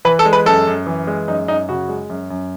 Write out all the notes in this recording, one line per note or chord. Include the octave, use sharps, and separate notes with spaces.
E3 B4
A4
G#3
B4
F#2 A4
F#2
E3
G#3
F#2 D#4
F#2 D#4
C#3 F#4
G#3
F#2
F#2